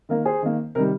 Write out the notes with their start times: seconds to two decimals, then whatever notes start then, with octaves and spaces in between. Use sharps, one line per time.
0.09 D#3 A#3 A#4
0.25 G#4 C5
0.42 D#3 A#3
0.75 C3 D#3 G3 A#4